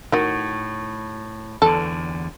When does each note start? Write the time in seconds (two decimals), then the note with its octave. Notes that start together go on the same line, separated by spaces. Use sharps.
0.12 A2 D#3 F#4
1.62 E2 D3 A4